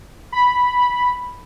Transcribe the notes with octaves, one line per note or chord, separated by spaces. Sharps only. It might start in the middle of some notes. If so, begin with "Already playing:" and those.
B5